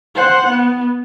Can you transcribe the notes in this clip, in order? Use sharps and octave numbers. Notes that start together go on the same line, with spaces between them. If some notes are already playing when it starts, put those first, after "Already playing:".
C5 F#5
B3